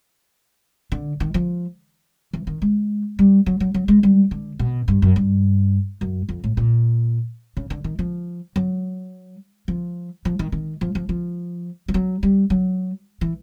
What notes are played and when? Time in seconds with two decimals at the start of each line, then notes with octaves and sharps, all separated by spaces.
0.92 D3
1.20 D#3
1.34 F3
2.33 E3
2.47 D#3
2.62 G#3
3.19 G3
3.46 F#3
3.60 F#3
3.74 F#3
3.88 G#3
4.03 G3
4.31 D3
4.59 B2
4.88 G2
5.02 F#2
5.16 G2
6.01 F#2
6.29 F2
6.44 A2
6.57 A#2
7.57 C#3
7.70 D3
7.84 D#3
7.99 F3
8.56 F#3
9.68 F3
10.25 F3
10.39 D#3
10.52 D#3
10.81 F3
10.95 F3
11.09 F3
11.88 F3
11.94 F#3
12.23 G3
12.50 F#3
13.21 E3